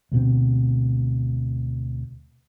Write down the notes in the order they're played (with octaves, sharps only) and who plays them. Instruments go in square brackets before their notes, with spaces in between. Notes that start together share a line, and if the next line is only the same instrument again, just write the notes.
[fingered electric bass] D2 B2 C4